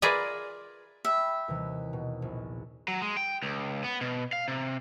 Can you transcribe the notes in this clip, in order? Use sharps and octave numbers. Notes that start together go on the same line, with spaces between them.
F4 G#4 A#4 B4 D5 E5
E5 G5 B5
D#2 C3 E3
B2
A#1
F#3
G#3
G5
C#2
B3
B2
F5
C3